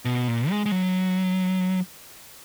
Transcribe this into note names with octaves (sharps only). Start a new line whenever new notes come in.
B2
A#2
G#3
G#3
F#3